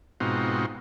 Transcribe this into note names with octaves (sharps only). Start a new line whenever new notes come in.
G#2 B2 C4 D#4 F4 F#4